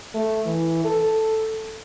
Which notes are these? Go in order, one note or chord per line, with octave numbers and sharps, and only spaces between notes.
A3
E3
A4